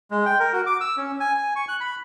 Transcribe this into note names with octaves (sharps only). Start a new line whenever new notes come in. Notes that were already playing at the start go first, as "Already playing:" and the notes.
G#3
G5
A#4
F#4
D6
E6
C#4
G#5
G#5
C#6
F#6
B5